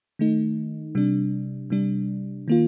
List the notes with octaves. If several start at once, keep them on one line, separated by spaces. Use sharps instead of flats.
D#3 A3 D#4
C3 G3 D4
C3 G3 D4
D#3 A#3 F4